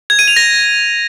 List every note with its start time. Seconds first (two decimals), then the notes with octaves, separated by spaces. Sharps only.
0.10 G#6
0.19 D#7
0.28 F7
0.36 A#6